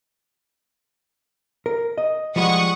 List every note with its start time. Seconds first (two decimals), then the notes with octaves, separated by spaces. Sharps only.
1.66 A#4
1.98 D#5
2.36 F3 G3 G#3 F#5 C#6 D#6